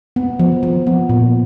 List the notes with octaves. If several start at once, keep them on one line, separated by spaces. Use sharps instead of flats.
B3
F3
F3
B3
A#2